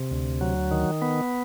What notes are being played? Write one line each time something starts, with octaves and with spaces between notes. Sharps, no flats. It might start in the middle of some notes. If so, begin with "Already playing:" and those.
Already playing: C3
D2
F#3
D#3
B3